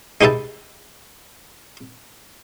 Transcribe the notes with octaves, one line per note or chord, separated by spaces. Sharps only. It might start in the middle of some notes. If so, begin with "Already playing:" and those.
G#3 D#4 G4 B4 E5 A5